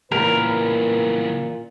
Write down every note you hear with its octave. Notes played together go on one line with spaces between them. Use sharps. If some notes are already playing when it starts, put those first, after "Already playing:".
A#2 C#3 E3 A#4 B4